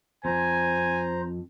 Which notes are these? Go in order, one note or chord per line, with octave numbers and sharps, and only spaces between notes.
F2 C5 G#5 A#5